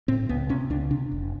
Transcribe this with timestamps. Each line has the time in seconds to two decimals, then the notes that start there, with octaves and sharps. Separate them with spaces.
0.08 A2 C4
0.29 C#2 B3
0.49 C3 C#4
0.70 C#2 D4
0.90 C3 D4
1.11 F1